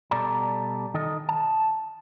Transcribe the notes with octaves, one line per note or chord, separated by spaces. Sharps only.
B2 G3 A4 D5 A#5
D#3 A4 D#5
A5